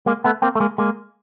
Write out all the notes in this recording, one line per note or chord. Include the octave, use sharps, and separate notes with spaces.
G#3 A#3
A3 B3
A#3 C4
A3
G#3 A#3
G#3 A#3